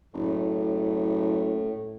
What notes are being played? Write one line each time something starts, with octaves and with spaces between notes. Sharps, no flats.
F#1 A2